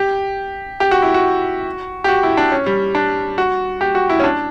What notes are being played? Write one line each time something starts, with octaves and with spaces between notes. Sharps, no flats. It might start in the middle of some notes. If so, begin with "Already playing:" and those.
Already playing: G4
G4
F#4
E4
F#4
G4
F#4
E4
D4
C#4
G3
D4
F#4
G4
F#4
E4
C#4
D4